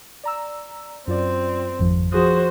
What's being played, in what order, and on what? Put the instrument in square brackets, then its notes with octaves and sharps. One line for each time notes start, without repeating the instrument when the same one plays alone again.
[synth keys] D5 A#5 E6
[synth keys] F#2 F4 D5 [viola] C4
[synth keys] G#1 F2 F3
[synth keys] F3 G#4 D#6 [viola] F#4 C5